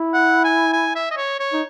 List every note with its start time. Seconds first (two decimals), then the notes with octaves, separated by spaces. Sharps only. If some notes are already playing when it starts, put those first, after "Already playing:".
Already playing: E4
0.14 F#5
0.44 G#5
0.73 G#5
0.95 E5
1.11 D#5
1.17 C#5
1.40 C#5
1.53 D#4